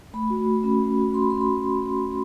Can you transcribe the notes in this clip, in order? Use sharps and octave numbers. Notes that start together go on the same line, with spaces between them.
A3 B5
F#4
A3
C#4 B5
A3
F#4
A3 C6
B5
C#4 C6
B5
A3